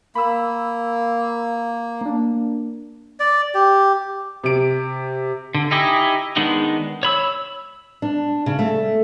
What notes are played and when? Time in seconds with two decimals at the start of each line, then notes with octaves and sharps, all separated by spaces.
0.15 A#3 B5 E6
2.01 A#3 D4
3.20 D5
3.54 G4
4.44 C3 D7
5.55 D3
5.71 D#4 E4 G4 D#5 G#5
6.36 D#3 G#3 B3 D4 D#4
7.03 C#5 B5 E6
8.02 D4
8.46 C#3
8.59 A3